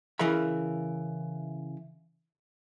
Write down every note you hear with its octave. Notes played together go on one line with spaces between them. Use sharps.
C#3 E3 A#4 E5 B5